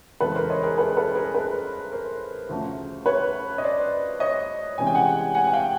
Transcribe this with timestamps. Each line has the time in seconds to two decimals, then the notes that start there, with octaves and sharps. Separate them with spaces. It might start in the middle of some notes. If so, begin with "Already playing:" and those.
0.20 E2 C#3 E3 G#3 A4 B4
0.35 A#4 C5
0.49 C#5 D#5
0.63 G#4 A#4
0.77 A4 B4
0.97 A4 B4
1.15 G#4 A#4
1.35 A4 B4
1.91 A#4 C5
2.49 D2 C#3 F3 A3 C#4
3.06 B4 C#5
3.58 D#5
3.64 C5 D5
4.20 C#5 D#5
4.78 C3 E3 G#3 C#4 G#5
4.87 G5
4.95 F#5 G#5
5.34 F#5 G#5
5.47 G#5
5.53 F5 G5